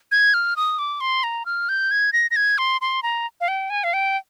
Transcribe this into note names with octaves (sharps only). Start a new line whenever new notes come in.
G#6
F6
D#6
D6
C6
A#5
F6
G6
G#6
A#6
A#6
G#6
C6
C6
A#5
F5
G5
G#5
F5
G5